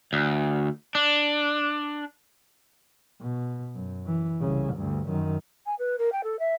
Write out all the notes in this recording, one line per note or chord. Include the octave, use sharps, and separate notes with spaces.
D2
D4
B2
F#2
E3
C2 C#3
D2 G2
F#2 D#3
G#5
B4
A#4
G5
A4
E5